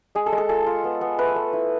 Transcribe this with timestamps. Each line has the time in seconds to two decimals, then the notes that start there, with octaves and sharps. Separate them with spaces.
0.15 G#3 G#4
0.26 A4
0.32 G#3
0.38 A4
0.49 F4 A4
0.66 F4
0.84 B3
1.01 B3
1.18 A3 B4
1.36 A3
1.53 E4